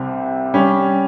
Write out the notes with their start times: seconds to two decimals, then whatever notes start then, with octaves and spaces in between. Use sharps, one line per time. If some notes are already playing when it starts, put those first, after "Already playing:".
Already playing: C2 C3 G3 C4
0.54 G3 C#4